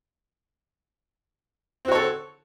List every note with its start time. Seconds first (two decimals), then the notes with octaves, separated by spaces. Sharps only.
1.85 C4
1.88 F#4
1.92 C#5
1.95 A4